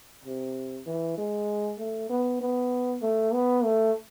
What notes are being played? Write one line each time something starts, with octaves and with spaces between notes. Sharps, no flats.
C3
E3
G#3
A3
B3
B3
A3
B3
A3